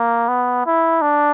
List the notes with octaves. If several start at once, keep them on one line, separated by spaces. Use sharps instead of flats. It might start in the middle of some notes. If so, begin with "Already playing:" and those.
Already playing: A#3
B3
E4
D4